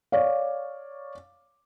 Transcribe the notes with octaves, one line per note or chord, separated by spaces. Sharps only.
C#5 D5 F5